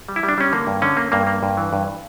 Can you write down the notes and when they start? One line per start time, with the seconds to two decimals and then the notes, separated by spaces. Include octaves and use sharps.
0.08 G3
0.16 E4
0.23 G3
0.29 D4
0.38 G3 C#4
0.52 D3 A#3
0.67 G2
0.82 D3 C#4
0.97 A#3
1.12 G2 A#3
1.27 A#3
1.43 G2
1.57 E3
1.73 G2